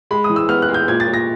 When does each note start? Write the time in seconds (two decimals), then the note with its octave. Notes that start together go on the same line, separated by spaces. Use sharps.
0.11 G#3 B5
0.24 D#6
0.30 E3
0.36 E6
0.49 B3 F6
0.62 F#6
0.69 G#3
0.74 G6
0.88 A#2 G#6
1.00 A6
1.07 A#2
1.14 A#6